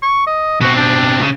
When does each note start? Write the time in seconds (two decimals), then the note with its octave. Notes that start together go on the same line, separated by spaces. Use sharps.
0.02 C#6
0.26 D#5
0.61 B2 C4 F#4
0.76 D4
1.20 A#2 C#3